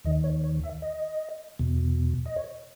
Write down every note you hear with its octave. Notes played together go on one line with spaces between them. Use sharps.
D#2 D#3 D#5
C#5
C#5
E5
D#5
E2 B2
D#5
C#5